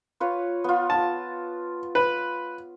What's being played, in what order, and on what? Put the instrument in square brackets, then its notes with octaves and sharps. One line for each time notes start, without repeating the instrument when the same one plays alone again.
[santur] F4 B4 C#5
B3 F4
[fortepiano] A5
B4